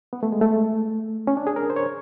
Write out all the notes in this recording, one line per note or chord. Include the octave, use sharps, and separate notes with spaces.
B3
A3
G#3
A3
C#4
D4
G#4
A#4
C5
C#5